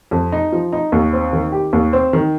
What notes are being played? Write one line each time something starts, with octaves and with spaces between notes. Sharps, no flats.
F2
D#4
F3
D#4
D#2
C4
D#3
G4
D#2
C4
D#3